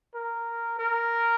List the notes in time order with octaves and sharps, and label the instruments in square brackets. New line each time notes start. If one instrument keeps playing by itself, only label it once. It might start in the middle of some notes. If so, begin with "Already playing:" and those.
[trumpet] A#4
A#4